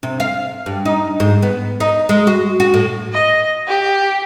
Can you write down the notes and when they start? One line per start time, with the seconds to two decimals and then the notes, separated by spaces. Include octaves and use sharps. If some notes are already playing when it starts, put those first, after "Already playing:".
0.03 C3
0.20 F5
0.66 G2
0.85 D#4
1.20 G#2
1.42 B3
1.80 D#4
2.09 G#3
2.27 F#4
2.60 F#4
2.74 A2
3.13 D#5
3.68 G4